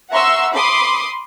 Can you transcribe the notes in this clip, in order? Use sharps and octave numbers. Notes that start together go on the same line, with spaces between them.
E5 F#5 A#5 C6 C#6 E6
B5 C6 D6 D#6